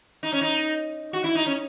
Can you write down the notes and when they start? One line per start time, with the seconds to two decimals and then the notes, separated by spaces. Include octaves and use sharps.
0.23 D#4
0.33 C#4
0.41 D#4
1.13 F#4
1.24 E4
1.35 D#4
1.46 C#4